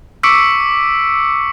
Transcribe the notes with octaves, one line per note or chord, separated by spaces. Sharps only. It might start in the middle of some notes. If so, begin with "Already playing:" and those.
C#6 D6 E6 B6 C#7 D7